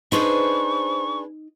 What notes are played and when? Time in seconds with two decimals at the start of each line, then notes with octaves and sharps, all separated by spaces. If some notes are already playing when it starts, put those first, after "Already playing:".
0.12 D4 D#4 G#4 B4 C5 C#6